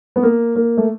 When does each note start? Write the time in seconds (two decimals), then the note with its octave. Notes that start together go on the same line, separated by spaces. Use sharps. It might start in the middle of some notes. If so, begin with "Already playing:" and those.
0.16 B3
0.23 A#3
0.56 A#3
0.77 A3